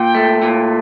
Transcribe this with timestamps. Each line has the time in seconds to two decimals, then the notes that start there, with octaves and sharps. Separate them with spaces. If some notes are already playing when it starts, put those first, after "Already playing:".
Already playing: A#2 G5
0.15 A3
0.42 A#2